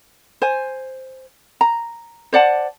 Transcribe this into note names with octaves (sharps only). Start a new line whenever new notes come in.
C5 G#5
A#5
C5 D5 F#5 A5